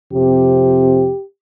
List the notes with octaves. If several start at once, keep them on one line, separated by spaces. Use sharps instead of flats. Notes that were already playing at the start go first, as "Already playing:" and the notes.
F2 C3 G4